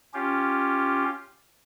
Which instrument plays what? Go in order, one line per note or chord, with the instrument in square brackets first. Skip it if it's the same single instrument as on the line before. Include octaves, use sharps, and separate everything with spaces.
[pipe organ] C#4 F4 G4